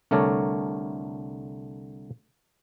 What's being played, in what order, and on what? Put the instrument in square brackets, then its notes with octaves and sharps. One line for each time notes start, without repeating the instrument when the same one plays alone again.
[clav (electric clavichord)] C2 D3 A3 A#4 C#5 D5